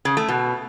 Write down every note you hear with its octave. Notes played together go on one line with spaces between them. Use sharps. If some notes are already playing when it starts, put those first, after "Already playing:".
C#3
A3
B2